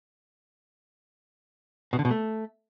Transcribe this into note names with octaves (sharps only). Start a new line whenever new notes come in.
B2
D3
B2
A3